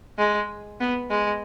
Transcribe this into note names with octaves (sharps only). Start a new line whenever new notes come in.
G#3
B3
G#3